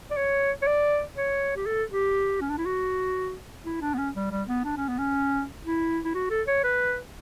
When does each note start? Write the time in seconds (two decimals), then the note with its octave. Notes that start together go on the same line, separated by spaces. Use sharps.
0.11 D5
0.17 C#5
0.62 C#5
0.67 D5
1.16 C#5
1.56 G4
1.66 A4
1.90 G4
2.41 C#4
2.50 D4
2.58 E4
2.66 F#4
3.65 E4
3.81 D4
3.94 B3
3.98 C#4
4.15 G3
4.31 G3
4.48 B3
4.65 D4
4.77 C#4
4.88 B3
4.98 C#4
5.64 E4
6.05 E4
6.14 F#4
6.30 A4
6.47 C#5
6.64 B4